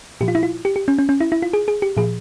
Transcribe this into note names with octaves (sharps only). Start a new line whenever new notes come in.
A#2 F3 G4
F4
E4
F4
G4
G4
C#4
C#4
C#4
E4
E4
F4
G#4
G#4
G4
A#2 F3 G#4